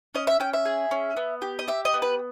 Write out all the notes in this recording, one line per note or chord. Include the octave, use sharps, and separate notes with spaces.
C#4 D#5
E5
C#4 G5
E5
G#4
C#4
B3
G4
D#5
G4 E5
D#5
B3
B4